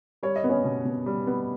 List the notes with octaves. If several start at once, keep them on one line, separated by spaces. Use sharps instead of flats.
G3 C#5
D#5
B3
C#4 C#5
B2
B2
G3
B3